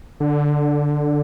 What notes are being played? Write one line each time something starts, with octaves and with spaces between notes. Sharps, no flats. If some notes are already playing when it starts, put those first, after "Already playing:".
D3